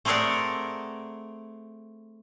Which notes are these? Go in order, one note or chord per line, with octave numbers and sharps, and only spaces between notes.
A3 C4 G#4 A#4 D5 F#5